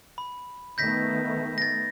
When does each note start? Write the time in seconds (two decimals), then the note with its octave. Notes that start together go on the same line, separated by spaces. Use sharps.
0.18 B5
0.78 D#3 A3 B3 G6 A#6 B6
1.58 A6 A#6